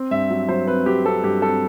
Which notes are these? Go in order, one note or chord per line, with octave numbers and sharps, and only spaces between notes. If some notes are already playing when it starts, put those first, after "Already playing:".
Already playing: C4
G2 E5
F#3
F#3 C5
C4 B4
F#3 G4
C4 A4
G2 G4
C4 A4